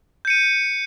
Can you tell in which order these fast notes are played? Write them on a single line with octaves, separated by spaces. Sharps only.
G6 C#7 D#7